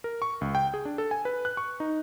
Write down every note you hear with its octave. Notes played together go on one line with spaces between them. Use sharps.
A#4
C#6
C#2
G5
G#4
D4
A4
G#5
B4
F#6
C#6
D#4